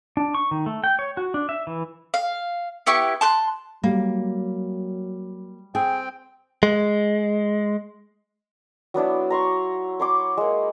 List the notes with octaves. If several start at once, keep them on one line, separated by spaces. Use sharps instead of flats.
D4
C#6
D#3
A3
G5
C#5
F#4
D4
E5
E3
F5
B3 E4 G4 C#6
A5 C6 F#6
F#3 G3 A#3
C4 G#4 G5
G#3
F#3 B3 D4 E4
A#5 C6 C#6
C#5 C6 D6
G#3 A#3